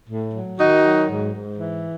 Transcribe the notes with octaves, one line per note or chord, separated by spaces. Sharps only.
A2
F#3
D#3 D#4 F#4
F#3
G#2
G#2
E3